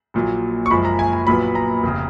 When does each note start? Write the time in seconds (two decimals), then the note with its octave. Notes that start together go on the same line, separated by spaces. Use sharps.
0.14 A#1 A#2 F#3
0.66 C#6
0.70 F#1 F#2 F3 G#3 B5
0.85 A#5
0.99 G#5
1.13 G#5
1.27 A#1 A#2 F#3 B3 B5
1.55 A#5
1.83 F1 C#3